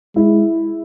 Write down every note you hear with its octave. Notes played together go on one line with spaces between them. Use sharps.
G#3 E4